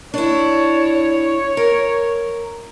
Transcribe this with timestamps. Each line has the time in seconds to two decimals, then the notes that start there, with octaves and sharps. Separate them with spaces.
0.14 D4 E4 C#5
1.57 A#4